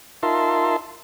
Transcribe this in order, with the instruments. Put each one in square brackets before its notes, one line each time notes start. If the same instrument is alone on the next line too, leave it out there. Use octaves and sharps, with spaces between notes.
[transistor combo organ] D#4 F4 A#4 E5 A5 C6